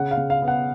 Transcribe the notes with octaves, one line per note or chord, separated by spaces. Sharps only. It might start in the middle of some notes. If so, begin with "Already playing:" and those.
Already playing: C#3 F#5
F5
C#3
F5
B3
F#5